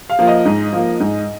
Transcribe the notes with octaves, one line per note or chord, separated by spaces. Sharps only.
F5
F3 A#3
D#5
G#2
F3 A#3
G#2